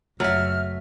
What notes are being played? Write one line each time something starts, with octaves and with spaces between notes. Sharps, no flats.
F#1 F#3 A3 E5 F6